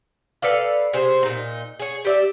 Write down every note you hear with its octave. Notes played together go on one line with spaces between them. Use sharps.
A4 B4 D5 F5
C3 G#4 C5
A#2 D#4
G#4 C#5
G4 D5 E5